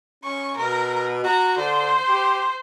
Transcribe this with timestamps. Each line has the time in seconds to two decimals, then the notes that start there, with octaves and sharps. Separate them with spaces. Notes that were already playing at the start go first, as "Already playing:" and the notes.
0.24 C#4 C#6
0.57 B2 A#4
1.24 F#4 A#5
1.57 D3 C5
2.08 G4